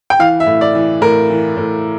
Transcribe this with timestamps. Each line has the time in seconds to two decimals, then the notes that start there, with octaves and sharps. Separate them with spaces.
0.10 G5
0.19 E3 F5
0.40 E5
0.46 A2
0.61 D5
0.75 E3
1.01 A2 A#4
1.30 E3
1.57 A2